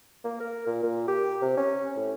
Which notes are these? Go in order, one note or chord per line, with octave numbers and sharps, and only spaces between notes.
A#3
A#4
A#2
A#2
G4
C3
C#4
A2